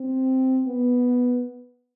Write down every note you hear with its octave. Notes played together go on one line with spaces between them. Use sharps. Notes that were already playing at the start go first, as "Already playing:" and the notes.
Already playing: C4
B3